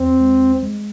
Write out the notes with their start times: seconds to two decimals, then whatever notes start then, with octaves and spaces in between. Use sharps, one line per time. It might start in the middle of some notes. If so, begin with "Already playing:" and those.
Already playing: E2 C4
0.20 G#3
0.63 G#3